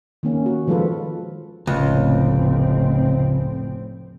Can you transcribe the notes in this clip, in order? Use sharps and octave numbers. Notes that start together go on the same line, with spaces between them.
D#3 A#3 C#4
F#4
D#3 F3 G#3 F4 A4 B4
F1 C#2 A2 C4